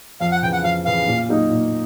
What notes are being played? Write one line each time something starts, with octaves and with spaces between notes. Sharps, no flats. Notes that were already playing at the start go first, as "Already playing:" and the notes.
F2 F5
F#5
C#3 E3 G5
F#5
F2 F5
C#3 E3 F5
A#2
F#3 A#3 D#4
A#2